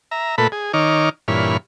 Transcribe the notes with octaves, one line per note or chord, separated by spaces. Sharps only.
E5 A#5
A#2 A3 A4 B4 B5
G#4
D#3 D#4 C#5 D6 F6
G2 A#2 E3 C#5 B5 F6